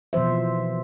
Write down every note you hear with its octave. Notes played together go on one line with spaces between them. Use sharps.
B2 E3 F3 C5 E5